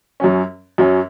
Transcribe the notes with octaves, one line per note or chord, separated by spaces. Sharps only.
F#2 F#3 C#4
F#2 F#3 C#4